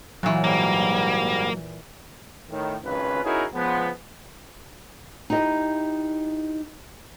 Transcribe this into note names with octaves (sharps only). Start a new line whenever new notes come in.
A#2 E3 F#3
G#2 G3 A#3
A2 D#3
G#1 C#2 C#4 F4 B4
C#4 D#4 E4 F#4 G#4 A#4
C#2 F3 G#3 B3
D#4 E4 G4 D#5